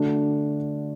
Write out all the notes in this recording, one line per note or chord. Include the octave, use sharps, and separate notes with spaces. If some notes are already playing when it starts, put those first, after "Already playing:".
Already playing: D3 A3 D4 F#4